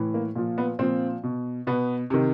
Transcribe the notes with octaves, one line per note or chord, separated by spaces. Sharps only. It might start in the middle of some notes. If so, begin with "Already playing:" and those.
Already playing: A2 E3
A#3
A#2 F3
B3
A#2 F3 C4
B2
B2 B3
C3 D#3